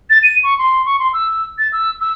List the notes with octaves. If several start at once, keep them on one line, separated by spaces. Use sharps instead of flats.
A6
D#7
C#6
C6
C#6
C6
E6
A6
E6
E6